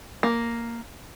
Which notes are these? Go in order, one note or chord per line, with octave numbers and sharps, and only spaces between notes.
A#3